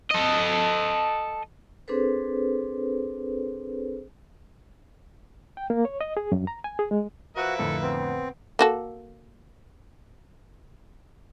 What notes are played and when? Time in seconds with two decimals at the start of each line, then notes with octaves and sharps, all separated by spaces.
0.11 A4 D#5
1.88 C4 D4 G#4 A4 B4 C5
5.57 G5
5.70 A#3
5.85 C#5
6.01 D#5
6.17 G#4
6.32 F#2
6.47 A#5
6.64 G#5
6.79 G#4
6.91 G#3
7.37 F3 A#3 F#4 B4 E5
7.58 F2 A2 D3 A4
7.83 B3 C4
8.59 A#3 F#4 A4